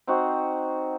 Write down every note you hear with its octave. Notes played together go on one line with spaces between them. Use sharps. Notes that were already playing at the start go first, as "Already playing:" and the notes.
C4 D#4 F#4